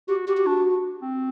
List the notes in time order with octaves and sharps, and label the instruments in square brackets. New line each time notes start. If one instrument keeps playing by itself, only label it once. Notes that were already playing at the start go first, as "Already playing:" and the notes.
[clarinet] F#4 [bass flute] G4
[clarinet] F#4 [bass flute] G4
[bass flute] G4
[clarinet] D4 [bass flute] F#4
[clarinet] C4